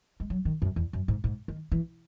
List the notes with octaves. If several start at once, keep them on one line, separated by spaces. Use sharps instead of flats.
G#3
F#3
D#3
F#2
E2
F#2
G#2
G#2
D#3
E3